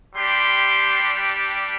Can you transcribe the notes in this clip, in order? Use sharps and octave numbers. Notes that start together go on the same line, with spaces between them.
G3 D4 G4 C6